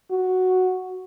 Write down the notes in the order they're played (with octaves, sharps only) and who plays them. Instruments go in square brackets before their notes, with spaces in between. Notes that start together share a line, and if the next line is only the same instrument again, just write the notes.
[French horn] F#4